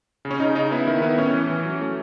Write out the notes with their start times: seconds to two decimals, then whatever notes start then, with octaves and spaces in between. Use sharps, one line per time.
0.25 C#3
0.31 C#4
0.40 C#3 D#4
0.55 C#3 D#4
0.71 B3 E4
0.87 D#3 E4
1.02 B3 E4
1.18 A2 C#4
1.34 E3
1.50 E3
1.65 F#3
1.81 A3